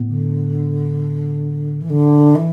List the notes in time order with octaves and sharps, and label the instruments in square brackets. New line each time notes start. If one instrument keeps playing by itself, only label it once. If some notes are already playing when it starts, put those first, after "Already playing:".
Already playing: [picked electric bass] A2 B3
[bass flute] D3
E3
D3
E3